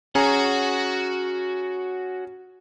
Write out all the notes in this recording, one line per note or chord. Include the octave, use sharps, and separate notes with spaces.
C#4 F#4 G#4 F#5 A#5